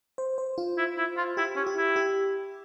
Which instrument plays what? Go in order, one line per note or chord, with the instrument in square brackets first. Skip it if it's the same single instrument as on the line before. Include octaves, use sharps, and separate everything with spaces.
[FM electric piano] C5
C5
F4
[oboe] E4
E4
F4
[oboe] E4 [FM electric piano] G4
[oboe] C#4
[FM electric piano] G4
[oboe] E4
[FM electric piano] G4